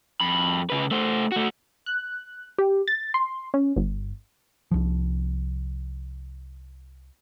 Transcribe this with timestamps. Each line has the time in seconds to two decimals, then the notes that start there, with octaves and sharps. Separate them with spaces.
0.21 F2 B5
0.70 C#3 B4
0.91 A3 C5
1.32 A3 F#4
1.86 F#6
2.58 G4
2.88 A6
3.14 C6
3.54 C#4
3.76 G1
4.71 C2 F3